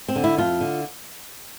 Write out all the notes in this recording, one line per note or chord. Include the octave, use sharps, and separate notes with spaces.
C4
D3
E4
F2 F4
D3